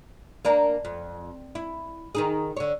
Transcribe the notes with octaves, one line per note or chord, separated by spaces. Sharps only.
A#3 D4 A#4
F2
E4
D#3 D#4 G#4
D3 C#5